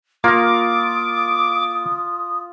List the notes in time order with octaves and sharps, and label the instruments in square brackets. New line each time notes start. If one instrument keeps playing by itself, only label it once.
[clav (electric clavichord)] A#3 A#4 [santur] F4 [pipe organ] D6 [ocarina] D#6